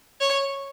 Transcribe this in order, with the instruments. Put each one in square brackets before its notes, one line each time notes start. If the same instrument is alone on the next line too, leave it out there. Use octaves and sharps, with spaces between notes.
[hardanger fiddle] C#5